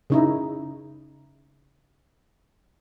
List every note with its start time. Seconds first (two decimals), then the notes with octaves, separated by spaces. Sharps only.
0.10 C#3 D#4 E4